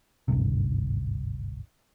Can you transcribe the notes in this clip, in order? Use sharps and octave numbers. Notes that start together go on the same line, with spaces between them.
G#1 D2 G2 C3